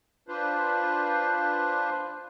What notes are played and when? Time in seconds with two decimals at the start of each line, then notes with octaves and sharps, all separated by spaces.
0.28 D4 F4 B4 C5